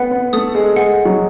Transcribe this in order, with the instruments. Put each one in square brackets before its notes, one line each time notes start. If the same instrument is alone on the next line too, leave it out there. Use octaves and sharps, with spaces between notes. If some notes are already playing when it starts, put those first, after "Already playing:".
Already playing: [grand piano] A3 B3 B4 [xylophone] F#5
[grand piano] B3 B4
[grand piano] A3 A4 [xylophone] D#6
[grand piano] G#3 G#4
[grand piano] G#3 G#4 [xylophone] F#5
[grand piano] F#3 F#4